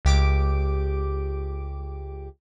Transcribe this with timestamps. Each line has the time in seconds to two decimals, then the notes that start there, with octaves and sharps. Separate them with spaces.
0.05 C#2 G4 D6 D7